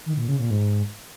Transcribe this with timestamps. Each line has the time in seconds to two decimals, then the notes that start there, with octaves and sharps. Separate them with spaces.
0.06 D#3
0.17 A#2
0.28 C#3
0.39 A#2
0.51 G#2